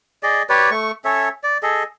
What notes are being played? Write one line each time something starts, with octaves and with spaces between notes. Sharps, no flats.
G#4 D5 D#5
G4 B4 C#5 D5
A3 C#6
C#4 A4 C#5 E5
D5
G#4 A4 D#5